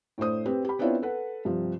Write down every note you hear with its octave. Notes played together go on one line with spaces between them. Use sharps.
A2 A3 D4 C5 D#6
C4 G4 B4
G4 B5
B3 C4 D4 E4 F4 C#5
A4 B4 F#5
G2 C3 F3